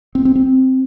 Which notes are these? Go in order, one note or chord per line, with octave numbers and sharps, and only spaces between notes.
C4
C4
C4